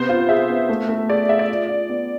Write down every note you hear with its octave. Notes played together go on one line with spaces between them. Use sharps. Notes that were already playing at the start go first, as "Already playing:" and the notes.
Already playing: C3 B3 C5
F4
G#4 E5
B3
A3
A3
G#4 D5
G#4 E5
D5
F4
F4
B3